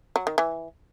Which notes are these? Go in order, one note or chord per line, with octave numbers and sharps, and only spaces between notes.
F#3
D#3
E3